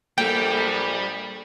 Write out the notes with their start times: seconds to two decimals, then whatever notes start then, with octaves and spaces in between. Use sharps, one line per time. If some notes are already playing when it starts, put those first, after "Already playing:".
0.18 A#1 G3 A#3 A4 F#5 G5